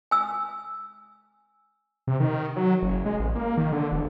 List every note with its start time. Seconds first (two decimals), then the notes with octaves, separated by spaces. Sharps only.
0.11 G#5 E6
2.07 C3
2.20 D#3
2.56 F#3
2.82 F#1
3.06 G#3
3.19 A1
3.35 A#3
3.57 D#3
3.72 D3
3.92 E1